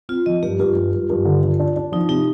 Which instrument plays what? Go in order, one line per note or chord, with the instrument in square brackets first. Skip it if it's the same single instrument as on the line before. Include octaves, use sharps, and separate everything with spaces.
[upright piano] C4 [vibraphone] F4
[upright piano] F3 [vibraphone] D#5
[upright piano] G2 [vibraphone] G4
[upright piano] G2 [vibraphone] F4
[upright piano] G2
G2
G2
D3
D3
D4
D4
[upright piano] F3 [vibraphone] D#4
[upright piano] C3 [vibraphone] D#4